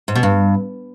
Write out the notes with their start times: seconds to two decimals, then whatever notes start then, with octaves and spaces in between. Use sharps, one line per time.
0.08 G#2
0.15 B2
0.23 G2